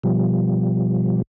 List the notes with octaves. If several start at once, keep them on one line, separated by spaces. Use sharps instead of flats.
B2 F3 G3